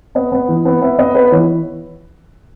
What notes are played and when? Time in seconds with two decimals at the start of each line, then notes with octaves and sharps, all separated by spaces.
0.15 B3 D#5
0.32 B3
0.48 E3
0.65 B3
0.81 B3 E5
0.98 B3 D#5
1.15 B3 B4
1.32 E3 C#5